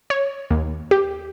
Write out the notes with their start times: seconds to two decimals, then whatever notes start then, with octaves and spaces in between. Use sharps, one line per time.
0.10 C#5
0.51 D#2
0.91 G4